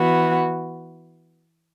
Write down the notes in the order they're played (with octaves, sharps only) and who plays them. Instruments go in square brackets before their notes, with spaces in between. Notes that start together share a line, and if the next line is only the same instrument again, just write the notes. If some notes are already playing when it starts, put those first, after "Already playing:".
Already playing: [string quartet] E3 B3 F#4